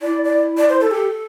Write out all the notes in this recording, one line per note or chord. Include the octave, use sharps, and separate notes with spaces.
E4 D5
D5
D5
C5
A4
G4 A4